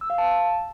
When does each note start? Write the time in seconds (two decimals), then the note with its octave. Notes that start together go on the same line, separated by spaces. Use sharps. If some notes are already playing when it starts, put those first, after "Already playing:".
0.01 E6
0.10 F5
0.18 A5